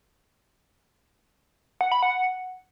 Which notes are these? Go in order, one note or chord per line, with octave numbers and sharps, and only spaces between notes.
F#5
B5
F#5